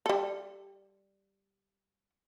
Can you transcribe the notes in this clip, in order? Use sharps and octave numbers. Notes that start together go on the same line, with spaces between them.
G3 A4